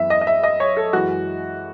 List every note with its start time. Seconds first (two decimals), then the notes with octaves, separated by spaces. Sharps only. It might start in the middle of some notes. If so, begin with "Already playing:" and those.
Already playing: F#2 E3 B3 E5
0.10 D#5
0.21 D#5
0.27 E5
0.43 D#5
0.60 C#5
0.77 A4
0.93 F#2 E3 G#3 F#4